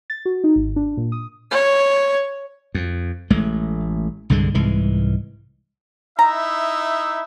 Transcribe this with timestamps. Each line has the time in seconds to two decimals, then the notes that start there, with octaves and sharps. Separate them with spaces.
0.10 A6
0.25 F#4
0.44 D#4
0.56 G#1
0.76 D4
0.97 A#2
1.12 D#6
1.51 C#5
2.74 F2
3.30 A1 G#3 A3
4.30 C2 G2 D3 G#3
4.55 C2 G#2 E3 G#3
6.19 D#4 E4 E5 A#5